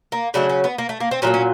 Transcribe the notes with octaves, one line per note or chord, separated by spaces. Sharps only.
A#3
C#3 F#3 A3 D4
C#4
B3
A#3
A3
A#3
C4
A#2 F#3 A3 C#4
C#4